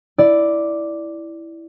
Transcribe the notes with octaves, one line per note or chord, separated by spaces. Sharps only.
E4 D5